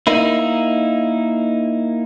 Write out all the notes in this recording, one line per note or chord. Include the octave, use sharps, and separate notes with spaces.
A#3 D#4 E4